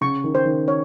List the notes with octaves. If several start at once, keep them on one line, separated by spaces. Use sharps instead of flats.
C#3 C#6
D#3
C5
D#3
C#5